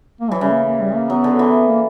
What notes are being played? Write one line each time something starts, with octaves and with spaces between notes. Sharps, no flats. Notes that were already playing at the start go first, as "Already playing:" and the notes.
A#3
E3 F#3
C#3 G3
A#3
A#3
G3
A#3
F#3 B3
D3
E3
A#3